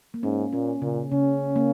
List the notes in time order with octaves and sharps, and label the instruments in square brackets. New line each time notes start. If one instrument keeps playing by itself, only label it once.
[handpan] A#3
[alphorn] G#2 [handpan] C#4
[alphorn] A#2 [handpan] C#4
[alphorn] A#2 [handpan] C#3
[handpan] C#3 [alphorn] C#4
[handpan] A#3